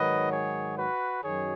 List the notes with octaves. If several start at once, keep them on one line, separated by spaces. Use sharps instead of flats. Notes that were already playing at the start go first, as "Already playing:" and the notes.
Already playing: G#2 D#3 F#3 B4 D#5
G#4 C#5
F#4 B4
F#2 D#3 F#3 G#4 C#5